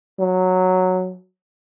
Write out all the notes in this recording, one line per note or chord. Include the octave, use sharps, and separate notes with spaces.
F#3